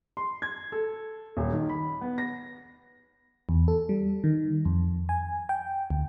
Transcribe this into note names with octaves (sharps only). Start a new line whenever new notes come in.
C6
G#6
A4
D#1
D#3
B5
B3
A#6
E2
A4
G3
D#3
F2
G#5
G5
D2